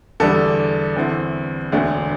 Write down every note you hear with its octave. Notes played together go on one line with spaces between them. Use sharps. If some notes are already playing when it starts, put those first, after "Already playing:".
E2 D3 G3 D4 A4
E2 D3 C4 E4
E1 D2 D3 A3 D4